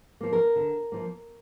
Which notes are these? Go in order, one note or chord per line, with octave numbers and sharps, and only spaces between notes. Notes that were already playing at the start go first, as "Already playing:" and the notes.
F3 A#3
A#4
D3
F3 A#3